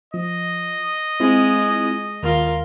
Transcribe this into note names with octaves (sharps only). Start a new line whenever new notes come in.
F3 D#5
G#3 C4 E4 F4
D#2 F4 A#4